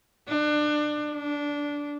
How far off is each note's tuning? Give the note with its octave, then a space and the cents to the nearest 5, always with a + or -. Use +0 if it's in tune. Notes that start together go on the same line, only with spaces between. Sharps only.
D4 +25
D4 -15